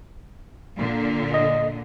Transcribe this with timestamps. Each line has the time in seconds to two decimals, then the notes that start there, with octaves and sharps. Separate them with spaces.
0.77 A#2 D3
1.34 D#5